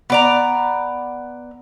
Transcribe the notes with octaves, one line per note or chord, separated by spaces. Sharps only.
B3 D5 A#5